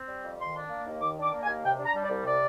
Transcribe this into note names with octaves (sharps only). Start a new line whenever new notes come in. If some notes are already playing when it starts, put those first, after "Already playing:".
Already playing: C4
G3
F2
D#3 C6
D4
A#3
D#2
D#3 D6
D4
D6
A#3
G#5
D#2
C3 G5
D4
A#5
G3
D5
C2
C3 D5